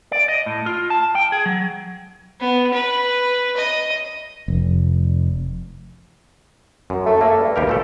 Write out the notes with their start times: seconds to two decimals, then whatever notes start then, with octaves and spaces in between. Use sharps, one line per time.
0.12 D5
0.28 D#5
0.46 A2
0.66 F4
0.90 A5
1.15 G5
1.32 G#4
1.46 F#3
2.40 B3
2.73 B4
3.57 D#5
4.48 F1
6.90 F#2
7.06 A3
7.21 A3 A#3
7.40 G2
7.56 D#2 G4 A#4
7.67 A#2 A3 A4